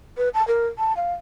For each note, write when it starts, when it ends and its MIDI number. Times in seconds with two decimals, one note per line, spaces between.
0.17 0.29 71
0.34 0.46 81
0.48 0.67 70
0.78 0.96 81
0.97 1.13 77